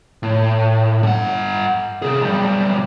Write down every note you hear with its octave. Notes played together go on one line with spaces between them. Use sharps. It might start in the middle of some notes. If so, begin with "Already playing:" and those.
A2
G2 F#5
C3 G#4
B1 G3